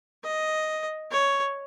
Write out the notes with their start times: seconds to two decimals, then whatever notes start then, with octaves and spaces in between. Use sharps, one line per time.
0.24 D#5
1.11 C#5